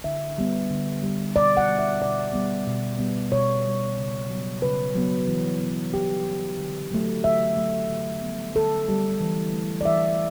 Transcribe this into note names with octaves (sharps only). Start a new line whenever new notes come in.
D3 E5
G3 B3
D3
G3 B3
B2 D5
F#5
G3 B3
E5
B2 D5
G3 B3
B2
G3 B3
B2 C#5
G3 B3
C#3
F#3 B3
C#3 B4
F#3 B3
E3
B3
E3 G4
B3
D3
F#3 A3
D3 E5
F#3 A3
D3
G3 B3
D3 A4
G3 B3
E3
A3
D5
E3 E5